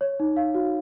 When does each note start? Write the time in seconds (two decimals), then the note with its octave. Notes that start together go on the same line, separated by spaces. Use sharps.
0.01 C#5
0.20 D#4
0.37 F5
0.54 F#4